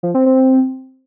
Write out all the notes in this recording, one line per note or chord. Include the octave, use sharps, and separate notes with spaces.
F3
C4
C4